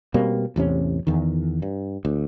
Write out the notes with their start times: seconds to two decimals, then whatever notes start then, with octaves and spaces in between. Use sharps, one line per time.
0.14 B2 G3 A#3 C4
0.56 A1 E2 C3 C#4
1.07 E2 D#3
1.62 G2
2.05 D2